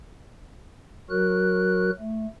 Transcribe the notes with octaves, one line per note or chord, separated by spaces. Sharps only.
F#3 F#4 A#4 F#6
A3